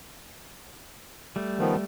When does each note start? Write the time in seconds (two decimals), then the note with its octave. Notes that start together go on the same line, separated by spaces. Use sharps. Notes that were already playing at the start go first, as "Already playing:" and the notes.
1.36 G3 A3
1.59 D#3 F3 B3